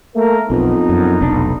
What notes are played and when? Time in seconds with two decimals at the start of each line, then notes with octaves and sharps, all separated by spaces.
0.16 A3 A#3 A#4
0.50 B1 F2 B3 D#4
0.89 F#2
1.21 F1 B1 D4